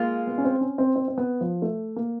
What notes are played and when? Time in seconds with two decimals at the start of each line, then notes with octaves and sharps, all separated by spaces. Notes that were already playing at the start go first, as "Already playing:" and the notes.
Already playing: G#3 A#3 F4
0.27 B3
0.38 C#4
0.44 C4
0.61 C#4
0.78 C4
0.96 C4
1.08 C4
1.18 B3
1.41 F3
1.62 A3
1.96 A#3